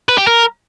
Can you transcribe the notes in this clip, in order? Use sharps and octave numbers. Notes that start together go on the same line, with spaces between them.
B4
G4
A#4